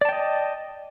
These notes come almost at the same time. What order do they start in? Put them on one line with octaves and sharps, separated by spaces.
D5 A5 G5 D#5